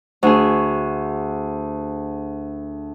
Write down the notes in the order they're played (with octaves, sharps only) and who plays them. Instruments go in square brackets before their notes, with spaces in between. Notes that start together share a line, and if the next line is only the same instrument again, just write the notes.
[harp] D2 G#4